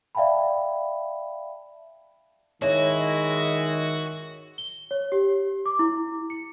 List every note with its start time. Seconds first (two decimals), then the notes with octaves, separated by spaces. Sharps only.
0.15 D5 E5 F5 G5 A5 B5
2.62 D#3 G#3 E4 F#4 C#5
4.58 G7
4.91 C#5
5.12 G4
5.66 D6
5.79 E4
6.30 C#7